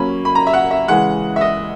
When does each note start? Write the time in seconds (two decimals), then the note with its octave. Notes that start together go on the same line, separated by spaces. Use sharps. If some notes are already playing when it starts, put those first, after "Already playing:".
Already playing: F#3 A#3 C#4 B5
0.25 B5
0.35 A#5
0.47 E5
0.53 F#5
0.71 E5
0.88 C#3 E3 G#3 F#5
1.36 E5
1.41 D#5